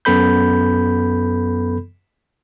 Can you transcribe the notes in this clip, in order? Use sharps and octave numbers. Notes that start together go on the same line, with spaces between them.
F#2 B3 A4 B5 G6